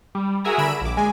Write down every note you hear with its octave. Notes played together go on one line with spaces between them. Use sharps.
G3
F#4 G#4 A#4 E5 G#5 A#5
D3 B5 E6 D7 E7
A#1 D6
G#3 G#5